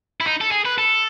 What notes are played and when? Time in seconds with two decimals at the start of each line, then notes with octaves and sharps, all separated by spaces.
0.20 E4
0.26 D#4
0.41 A4
0.51 G#4
0.65 B4
0.78 A4